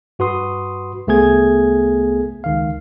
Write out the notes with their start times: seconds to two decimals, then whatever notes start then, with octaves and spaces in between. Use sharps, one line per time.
0.19 G2 F#4 B4 C6 D#6
1.07 C2 A3 B3 G#4 G#6
2.44 C#2 D#3 F5